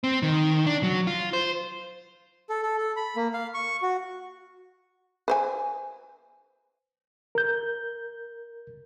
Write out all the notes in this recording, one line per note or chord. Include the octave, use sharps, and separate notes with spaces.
C4
D#3
D4
F#3
F4
C5
A4
A4
A4
B5
A#3
F5
C#6
F#4
B4 C5 G#5
A#4 G6